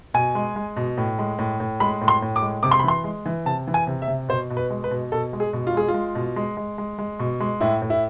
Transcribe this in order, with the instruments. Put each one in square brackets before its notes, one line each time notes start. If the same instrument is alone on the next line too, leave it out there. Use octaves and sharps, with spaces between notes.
[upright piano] B2 G#5
G#3
G#3
B2
A2
G#3
A2
A2
G#3 B5
A2
C6
A2
D6
G#3
C3 D6
C6
B5
E3 C6
G#3
E3
C3 A5
E3
G#5
C3
E5
C3
B2 C5
B2
B4
G#3
B4
B2
B2 A4
G#3
G#4
B2
F4
G#3 G#4
F4
G#3
B2
G#3
G#3
G#3
G#3
B2
G#3
A2 E4
A2
E4